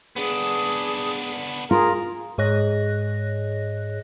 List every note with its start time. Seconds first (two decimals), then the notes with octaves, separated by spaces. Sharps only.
0.17 B3 D4 G#4
1.71 F4 G#4 A#4
2.38 G#2 G#4 C#5 D#5 F#6 A#6